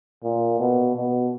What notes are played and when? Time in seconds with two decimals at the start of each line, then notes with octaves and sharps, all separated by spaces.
0.24 A#2
0.59 B2
0.96 B2